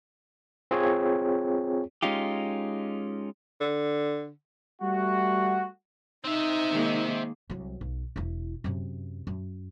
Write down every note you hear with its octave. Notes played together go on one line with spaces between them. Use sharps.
C4 F4 G#4 C#5
G#3 C#4 D#4 F4 G4
D3
G3 A3 F#4
C4 D#4 E5
D#3 G#3 A#3
C2 F#3
B1
E1 E4
F#2 C3
F#2